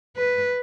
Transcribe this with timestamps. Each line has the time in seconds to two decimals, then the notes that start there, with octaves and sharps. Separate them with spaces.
0.17 B4